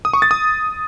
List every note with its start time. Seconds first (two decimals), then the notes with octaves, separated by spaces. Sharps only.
0.05 D#6
0.13 C#6
0.22 A6
0.31 D#6